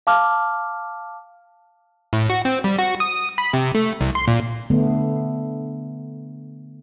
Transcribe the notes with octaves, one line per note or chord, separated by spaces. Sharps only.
F5 A5 D6 F6
A2
F#4
C4
G3
F#4
D#6
B5
C3
A3
C2
C6
A#2
D3 A3 B3